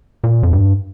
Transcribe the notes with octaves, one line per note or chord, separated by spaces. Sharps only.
A#2
F2
G2